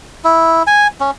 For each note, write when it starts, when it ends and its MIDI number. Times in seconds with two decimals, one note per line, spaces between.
0.24 0.63 64
0.67 0.87 80
1.00 1.11 61